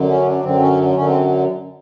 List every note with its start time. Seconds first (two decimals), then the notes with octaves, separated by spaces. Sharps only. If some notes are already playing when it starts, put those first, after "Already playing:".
Already playing: F#2 D3 F#3
0.09 C#4
0.26 D4
0.43 F#2 D3 F#3 C4
0.60 C#4
0.96 F#2 D3 F#3 C#4
1.06 C4